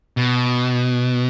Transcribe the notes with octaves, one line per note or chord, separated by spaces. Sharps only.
B2